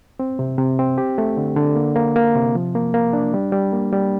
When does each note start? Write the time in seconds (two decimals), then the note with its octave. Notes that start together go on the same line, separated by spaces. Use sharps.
0.19 C4
0.39 C3
0.58 C3
0.79 C4
0.98 G4
1.18 A3
1.37 D3
1.56 D3
1.76 A#3
1.95 A#3
2.16 A#3
2.35 C3
2.55 F3
2.75 A#3
2.94 A#3
3.13 D4
3.34 G3
3.52 G3
3.72 A#3
3.93 G3